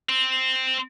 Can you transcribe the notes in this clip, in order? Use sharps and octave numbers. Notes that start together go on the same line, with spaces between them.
C4